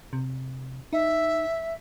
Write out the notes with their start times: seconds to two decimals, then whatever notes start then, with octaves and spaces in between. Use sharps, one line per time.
0.13 C3
0.93 D#4 E5